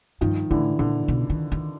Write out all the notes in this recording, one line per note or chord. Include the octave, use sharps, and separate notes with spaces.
G2 D#3 F3
A2 D3 E3
A#2 D3
B2
D#3
D#3